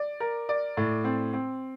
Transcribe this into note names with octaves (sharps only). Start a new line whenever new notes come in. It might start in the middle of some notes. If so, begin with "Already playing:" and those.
Already playing: D5
A#4
D5
A2
C4
C4